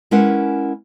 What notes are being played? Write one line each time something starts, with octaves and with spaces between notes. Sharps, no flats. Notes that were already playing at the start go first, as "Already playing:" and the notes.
G#3 C#4 E4 A#4 B4 F#5